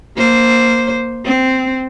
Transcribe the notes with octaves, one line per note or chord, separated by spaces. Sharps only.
A#3 C5
C4